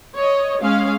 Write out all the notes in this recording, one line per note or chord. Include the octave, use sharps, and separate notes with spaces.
C#5 D#5
G#3 C#4 F5